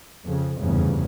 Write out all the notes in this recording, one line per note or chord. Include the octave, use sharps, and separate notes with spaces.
F2 C#3
F1 E2 G2 C#3